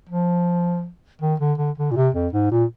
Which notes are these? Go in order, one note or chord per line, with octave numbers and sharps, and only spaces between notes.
F3
D#3
D3
D3
D3
A#2
C3
F2
G#2
A#2